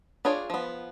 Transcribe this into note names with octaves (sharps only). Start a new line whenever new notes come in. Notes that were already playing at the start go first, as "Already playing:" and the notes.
D4 F4 G#4 C#5 D5
F3 B3